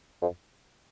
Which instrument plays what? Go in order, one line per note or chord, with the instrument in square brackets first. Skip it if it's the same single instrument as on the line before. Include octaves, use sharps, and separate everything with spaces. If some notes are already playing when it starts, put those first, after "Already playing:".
[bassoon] F2